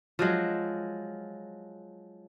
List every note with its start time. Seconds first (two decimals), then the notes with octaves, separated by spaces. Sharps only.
0.19 F3 F#3 G#3